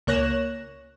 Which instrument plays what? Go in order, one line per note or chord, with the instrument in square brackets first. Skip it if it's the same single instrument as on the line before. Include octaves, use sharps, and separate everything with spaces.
[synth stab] C#2 A#3 C#5 F#6 A#6 E7